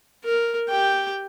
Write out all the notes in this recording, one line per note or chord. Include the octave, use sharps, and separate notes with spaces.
A#4
G4 G5